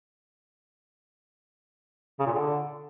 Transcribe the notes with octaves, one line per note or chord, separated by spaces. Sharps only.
C#3
A#2
D3